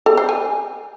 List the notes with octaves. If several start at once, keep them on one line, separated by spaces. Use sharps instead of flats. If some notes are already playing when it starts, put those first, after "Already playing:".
A4
C5
G#5